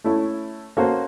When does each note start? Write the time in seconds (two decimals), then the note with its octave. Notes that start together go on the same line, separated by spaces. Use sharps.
0.04 A3 C#4 E4 A4
0.77 A#3 C#4 F#4 A4 C5